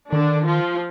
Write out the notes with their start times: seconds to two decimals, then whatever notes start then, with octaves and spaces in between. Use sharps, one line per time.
0.13 D3 D#3 D4
0.46 F3 F4